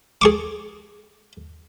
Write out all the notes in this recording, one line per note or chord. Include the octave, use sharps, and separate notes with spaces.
G#4 C#6 D6